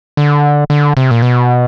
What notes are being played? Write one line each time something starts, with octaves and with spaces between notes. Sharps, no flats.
D3
D3
C3
A#2
B2